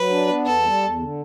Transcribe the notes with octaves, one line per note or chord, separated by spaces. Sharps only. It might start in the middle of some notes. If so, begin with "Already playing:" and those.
Already playing: F#3 B4
D4
B3
E2 A4
G3
E2
D3